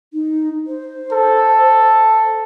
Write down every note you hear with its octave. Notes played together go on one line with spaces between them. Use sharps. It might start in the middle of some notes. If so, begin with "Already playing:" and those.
D#4
C5
A4